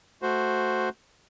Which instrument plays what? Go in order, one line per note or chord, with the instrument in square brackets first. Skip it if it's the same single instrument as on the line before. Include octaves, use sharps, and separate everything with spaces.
[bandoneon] A3 F#4 C5